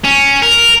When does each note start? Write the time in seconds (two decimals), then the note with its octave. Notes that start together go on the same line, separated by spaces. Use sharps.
0.04 C#4
0.42 A#4